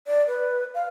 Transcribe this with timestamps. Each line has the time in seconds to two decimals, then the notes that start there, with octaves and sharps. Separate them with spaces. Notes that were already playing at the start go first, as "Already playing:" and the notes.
0.07 D5
0.28 B4
0.75 F5